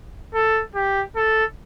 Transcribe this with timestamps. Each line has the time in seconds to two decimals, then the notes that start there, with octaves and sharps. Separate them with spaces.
0.34 A4
0.75 G4
1.16 A4